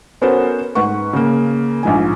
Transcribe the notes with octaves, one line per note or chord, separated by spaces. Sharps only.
B3 C#4 F#4 A4 A#4 C5
G#2 B4 F#5 C#6
C#3 A#3
A#1 G#2 F3 G#5